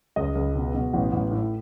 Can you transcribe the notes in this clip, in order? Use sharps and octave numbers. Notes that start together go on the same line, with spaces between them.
C#2 D#5
C#2
B2
B2
A1
A1
A2